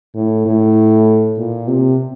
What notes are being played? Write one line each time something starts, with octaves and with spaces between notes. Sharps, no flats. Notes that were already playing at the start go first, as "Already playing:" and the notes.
A2
A2
A#2
C3